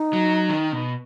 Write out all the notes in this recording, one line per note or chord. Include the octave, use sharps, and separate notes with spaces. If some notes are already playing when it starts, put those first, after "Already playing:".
Already playing: D#4
F#3
D#3
B2